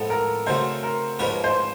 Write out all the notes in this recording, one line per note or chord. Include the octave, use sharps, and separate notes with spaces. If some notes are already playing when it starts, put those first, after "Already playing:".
Already playing: A2 F3 G#3 B3 A4
A#4
C#3 F#3 A3 C5
A#4
G#2 F3 A#3 C#4 F4 B4
C5